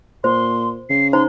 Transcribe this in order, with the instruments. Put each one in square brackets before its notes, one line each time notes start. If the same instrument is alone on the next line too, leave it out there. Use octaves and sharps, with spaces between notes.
[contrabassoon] A#2 [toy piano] C5 [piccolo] C6
[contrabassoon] C#3 [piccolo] C7
[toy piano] D#4 C5 A#5 [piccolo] C6